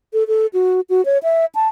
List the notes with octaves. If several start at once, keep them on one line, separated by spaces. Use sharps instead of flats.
A4
A4
F#4
F#4
C#5
E5
A5